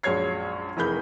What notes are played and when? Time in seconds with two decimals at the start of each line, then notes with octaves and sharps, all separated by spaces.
0.03 A#1 F#2 G#3 C#5 G#6 C7
0.77 F1 E3 G#4 A#4 B5 G6